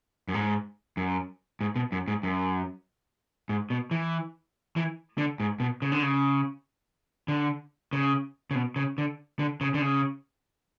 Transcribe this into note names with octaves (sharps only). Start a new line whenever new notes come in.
F#2
G#2
F#2
G#2
B2
F#2
G#2
F#2
G#2
B2
E3
E3
D3
G#2
B2
C#3
D3
C#3
D3
C#3
C#3
B2
C#3
D3
D3
C#3
D3
C#3